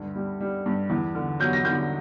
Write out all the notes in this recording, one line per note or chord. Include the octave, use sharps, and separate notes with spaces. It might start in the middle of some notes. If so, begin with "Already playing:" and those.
Already playing: D2 G2
G3
G3
G2
E2
D3
F#3 G6
A#6
D3 G6